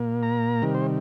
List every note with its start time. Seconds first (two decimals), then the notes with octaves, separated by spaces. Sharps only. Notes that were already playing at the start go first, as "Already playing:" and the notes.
Already playing: A#2 A#3
0.23 A#5
0.62 C3 D#3 G3 A#4
0.75 C5